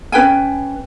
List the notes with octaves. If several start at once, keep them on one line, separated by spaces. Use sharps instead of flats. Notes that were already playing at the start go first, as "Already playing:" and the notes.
C#4 B4 G5 G#5